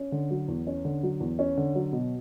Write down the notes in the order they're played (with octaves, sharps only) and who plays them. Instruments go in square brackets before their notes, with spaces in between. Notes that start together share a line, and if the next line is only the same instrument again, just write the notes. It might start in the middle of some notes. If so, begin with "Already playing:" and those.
Already playing: [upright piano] C#4
D3
F#3
E2
C#4
D3
F#3
E2
C#4
D3
F#3
B2